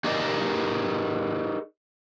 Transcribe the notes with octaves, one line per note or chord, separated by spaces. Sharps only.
D#4 G4 G#4 A#4 D5 D#5